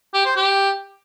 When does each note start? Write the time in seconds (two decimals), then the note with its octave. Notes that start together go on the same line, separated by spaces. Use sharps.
0.14 G4
0.25 C5
0.36 G4